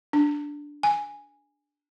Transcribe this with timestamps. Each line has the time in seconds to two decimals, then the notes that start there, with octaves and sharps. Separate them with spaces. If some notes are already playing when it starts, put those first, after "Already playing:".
0.13 D4
0.83 G#5